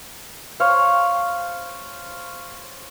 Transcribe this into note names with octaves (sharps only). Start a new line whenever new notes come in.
C5 C#5 F5